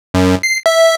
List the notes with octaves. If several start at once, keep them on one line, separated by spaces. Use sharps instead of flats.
F#2
C7
E5